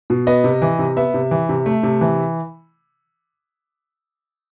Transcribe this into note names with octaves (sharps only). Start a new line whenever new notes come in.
B2
B3 D#5
C3
E3
C3
B3 E5
C3
E3
C3
A3
C3
E3